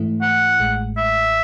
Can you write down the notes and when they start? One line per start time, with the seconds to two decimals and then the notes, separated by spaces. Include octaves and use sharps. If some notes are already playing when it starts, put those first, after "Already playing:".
Already playing: G#2 E3 A3 E4
0.22 F#5
0.60 A1 A2 G#3
0.97 E5